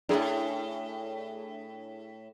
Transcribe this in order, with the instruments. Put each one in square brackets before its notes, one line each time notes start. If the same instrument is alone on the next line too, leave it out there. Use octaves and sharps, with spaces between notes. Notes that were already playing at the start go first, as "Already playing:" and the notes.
[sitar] F#2 A2 [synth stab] D4 E4 G#4